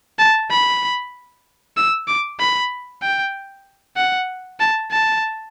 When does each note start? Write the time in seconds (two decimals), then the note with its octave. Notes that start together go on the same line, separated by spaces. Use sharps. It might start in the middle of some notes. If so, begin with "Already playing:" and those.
0.19 A5
0.51 B5
1.77 E6
2.07 D6
2.39 B5
3.02 G5
3.96 F#5
4.60 A5
4.91 A5